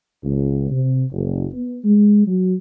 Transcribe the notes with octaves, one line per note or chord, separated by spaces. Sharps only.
C#2
C3
F#1
B3
G#3
F#3